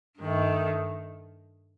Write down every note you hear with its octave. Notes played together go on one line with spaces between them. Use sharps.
G2 D#3 A3